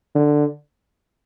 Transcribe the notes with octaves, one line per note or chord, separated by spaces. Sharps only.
D3